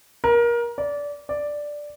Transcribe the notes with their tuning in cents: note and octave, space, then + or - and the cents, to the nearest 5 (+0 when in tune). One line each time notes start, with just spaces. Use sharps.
A#4 +25
D5 -20
D5 +0